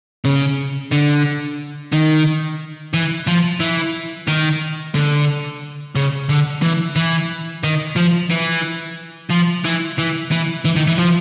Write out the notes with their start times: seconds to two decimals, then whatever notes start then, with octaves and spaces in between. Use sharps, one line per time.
0.25 C#3
0.91 D3
1.92 D#3
2.94 E3
3.27 F3
3.60 E3
4.28 D#3
4.95 D3
5.96 C#3
6.29 D3
6.62 E3
6.96 E3
7.63 D#3
7.96 F3
8.30 E3
9.30 F3
9.64 E3
9.98 E3
10.31 E3
10.65 E3
10.76 D#3
10.87 E3
10.98 F3